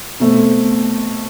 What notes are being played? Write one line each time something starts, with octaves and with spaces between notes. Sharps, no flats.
B2 A3 C4